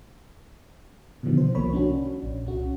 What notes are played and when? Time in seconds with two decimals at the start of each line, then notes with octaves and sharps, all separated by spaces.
1.23 B2 D3 D#3 F3 G3 B3
1.37 C5
1.55 C2 F3 A#3 C#5 B5
1.73 C#4 D4 F#4
2.22 A#1
2.45 C2 C#4 F#4